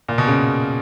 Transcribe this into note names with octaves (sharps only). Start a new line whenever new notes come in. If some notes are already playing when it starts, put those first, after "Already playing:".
A#2
B2
C#3